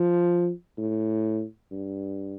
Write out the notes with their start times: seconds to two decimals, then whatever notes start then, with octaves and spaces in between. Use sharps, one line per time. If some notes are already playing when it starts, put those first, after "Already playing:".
Already playing: F3
0.78 A2
1.72 G2